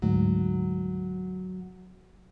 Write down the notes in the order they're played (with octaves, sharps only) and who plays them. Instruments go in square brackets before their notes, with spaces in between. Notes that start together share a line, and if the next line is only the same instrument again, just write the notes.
[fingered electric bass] D2 G#2 [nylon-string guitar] F#3